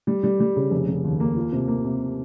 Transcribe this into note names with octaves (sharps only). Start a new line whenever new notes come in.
G3
G3
G3
C#3
F1
F1
D#2
A#3
F4
C3
A#3
C3